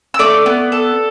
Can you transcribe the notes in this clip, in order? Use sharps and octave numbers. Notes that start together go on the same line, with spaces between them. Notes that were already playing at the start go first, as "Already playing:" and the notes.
E6
A3 D5 D6
B3
A4